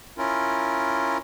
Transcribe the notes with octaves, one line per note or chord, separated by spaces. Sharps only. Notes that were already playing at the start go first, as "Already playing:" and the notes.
C#4 E4 F4 A#4